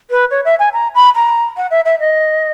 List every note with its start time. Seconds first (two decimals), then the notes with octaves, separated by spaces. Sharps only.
0.10 B4
0.30 C#5
0.45 E5
0.59 G#5
0.73 A#5
0.94 B5
1.15 A#5
1.56 F#5
1.70 E5
1.85 E5
1.99 D#5